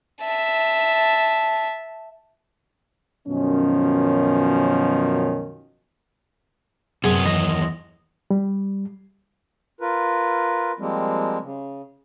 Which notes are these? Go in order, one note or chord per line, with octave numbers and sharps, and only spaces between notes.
E5 A5
F#2 B2 D#3 F3 C#4
F#2 C3 B3 G#4
D#2 E3 D#5
G3
F4 A#4 B4
F3 G3 G#3 A#3 C4
C#3